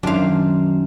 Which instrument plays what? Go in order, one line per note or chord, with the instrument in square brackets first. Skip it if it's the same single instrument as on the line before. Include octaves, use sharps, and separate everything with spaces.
[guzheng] F#2 C5 [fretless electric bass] D#3 F#3 [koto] D4 F5